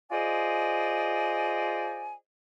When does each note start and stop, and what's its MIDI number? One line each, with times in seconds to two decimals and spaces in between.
0.12 2.15 65
0.12 2.15 68
0.12 2.15 72
0.12 2.15 74
0.12 2.15 75
0.12 2.15 80